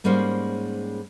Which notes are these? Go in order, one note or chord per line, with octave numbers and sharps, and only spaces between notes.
G#2 G3 G#3 A#3 C#4 C5